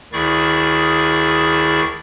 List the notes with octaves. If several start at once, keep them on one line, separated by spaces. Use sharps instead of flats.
D2 D#3 E4 G#4 D5 C#6